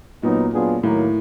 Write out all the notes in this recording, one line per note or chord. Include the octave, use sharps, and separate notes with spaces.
A#2 F#3 B3 D#4
F#3 B3 D4 F4 G#4
A2 D#3 F#3 A#3